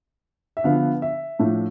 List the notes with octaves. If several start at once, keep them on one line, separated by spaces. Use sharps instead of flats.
E5
D3 F3 B3 F5
E5
A2 F3 A3 D4